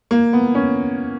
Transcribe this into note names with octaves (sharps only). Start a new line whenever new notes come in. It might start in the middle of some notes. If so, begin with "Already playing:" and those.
A#3
B3
C#4